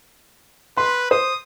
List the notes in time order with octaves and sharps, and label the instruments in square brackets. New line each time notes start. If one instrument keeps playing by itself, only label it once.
[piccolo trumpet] B4 [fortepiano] C6
[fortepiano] C5 [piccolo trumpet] D#6